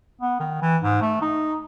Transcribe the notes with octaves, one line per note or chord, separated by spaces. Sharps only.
B3
D#3
E3
G#2
A3
D#4